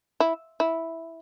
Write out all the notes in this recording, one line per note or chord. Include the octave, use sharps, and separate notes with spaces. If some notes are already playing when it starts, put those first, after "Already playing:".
E4
E4